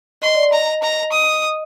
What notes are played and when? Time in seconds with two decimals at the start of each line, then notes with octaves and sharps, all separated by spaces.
0.22 D#5 C6
0.35 D5
0.49 D#5 A#5
0.82 A#5
1.12 D#6